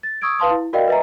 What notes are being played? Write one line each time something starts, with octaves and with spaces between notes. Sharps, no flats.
A6
C#6 D#6 E6 G#6 D7
B4 F5 A5 C6 D#6
E4
F#4 A#4 D5 D#5 F5 G5
B4 D#5 E5 G#5 A#5